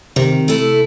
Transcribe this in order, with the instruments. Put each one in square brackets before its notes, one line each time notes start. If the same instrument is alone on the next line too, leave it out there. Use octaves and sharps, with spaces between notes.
[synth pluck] C3 [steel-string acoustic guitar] D#3
[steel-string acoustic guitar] A3 E4